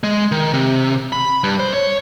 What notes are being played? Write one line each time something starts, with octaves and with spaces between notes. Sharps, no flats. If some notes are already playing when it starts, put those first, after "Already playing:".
G#3
D#3
C3
B5
G2
C5
C#5